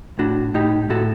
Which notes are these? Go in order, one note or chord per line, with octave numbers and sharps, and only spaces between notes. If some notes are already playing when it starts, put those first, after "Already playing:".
A2 D4 F#4
A2 D#4 G4
A2 F#4 A4